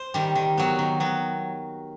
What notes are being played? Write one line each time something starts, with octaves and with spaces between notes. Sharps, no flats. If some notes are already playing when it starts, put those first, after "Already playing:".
Already playing: C5
D#3 G3
D#3
F#3 B3
D#3
F#3 B3